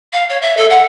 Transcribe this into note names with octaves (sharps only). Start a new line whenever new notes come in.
F5
C#5
E5
A4
F#5